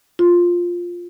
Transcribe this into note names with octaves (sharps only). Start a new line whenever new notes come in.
F4